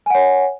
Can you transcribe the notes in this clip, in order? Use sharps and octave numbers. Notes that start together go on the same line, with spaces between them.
C#5 F#5 G#5